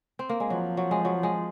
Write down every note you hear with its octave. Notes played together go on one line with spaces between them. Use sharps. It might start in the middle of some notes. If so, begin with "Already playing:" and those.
C4
A#3
G#3
F3 F#3
F#3
G#3
F#3
G#3